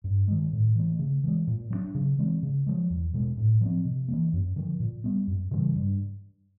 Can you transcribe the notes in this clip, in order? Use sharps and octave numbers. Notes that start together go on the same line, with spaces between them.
G2
D#3 G#3
A2
E3 A3
C#3
E3 G#3
A#2
F#3 A3 D4
C#3
E3 G#3 C4
C#3
F3 G#3
E2
B2 G#3
A2
F3 A3 C4
C3
E3 G3 A#3
F#2
D3 F3
A#2
G3 B3
F#2
C#3 E3 G3
G2